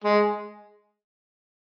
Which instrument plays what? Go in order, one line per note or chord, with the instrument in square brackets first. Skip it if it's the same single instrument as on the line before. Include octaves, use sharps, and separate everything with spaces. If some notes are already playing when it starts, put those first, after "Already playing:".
[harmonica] G#3